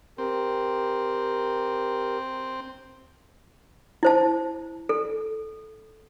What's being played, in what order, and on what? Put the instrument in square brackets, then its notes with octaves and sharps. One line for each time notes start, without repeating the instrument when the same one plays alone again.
[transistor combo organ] C4 [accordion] G4 A#4
[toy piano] E4 C5 A5
A4